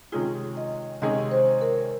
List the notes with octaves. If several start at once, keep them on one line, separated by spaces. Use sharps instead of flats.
C3 D#3 G#3 C#4 F4 G#4
D#5
C3 D#3 G#3 C#4 G#4 D#5
C5
A#4